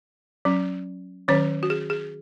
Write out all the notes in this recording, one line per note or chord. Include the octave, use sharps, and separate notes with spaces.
F#3 C#4
D#3 F#3 C#4 C#5
F#4
G#4
G#4